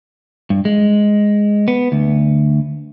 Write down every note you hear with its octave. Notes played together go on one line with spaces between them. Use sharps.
G2
G#3
B3
D2